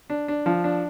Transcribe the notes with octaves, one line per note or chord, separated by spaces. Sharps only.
D4
D4
F3
D4